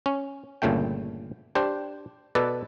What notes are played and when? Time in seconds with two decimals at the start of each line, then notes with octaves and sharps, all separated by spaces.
0.06 C#4
0.62 G1 A#2 C#3 A3 G5
1.55 D4 G4 C5
2.35 B2 A4 B4 D5